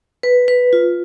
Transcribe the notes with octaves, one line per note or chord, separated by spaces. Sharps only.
B4
B4
F4